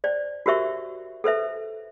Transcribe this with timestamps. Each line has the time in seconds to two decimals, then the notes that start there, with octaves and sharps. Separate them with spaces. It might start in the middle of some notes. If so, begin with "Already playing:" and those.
0.04 C5 D5
0.46 F#4 G4 A#4 C5 E5 C#6
1.24 A4 B4 C5 E5